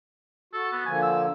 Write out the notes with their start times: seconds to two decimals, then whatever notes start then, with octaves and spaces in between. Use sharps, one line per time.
0.53 F#4 A4
0.72 B3
0.86 D3 F3 A#3 G#5
1.02 E6